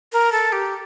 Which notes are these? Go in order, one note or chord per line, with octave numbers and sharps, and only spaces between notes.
A#4
A4
G4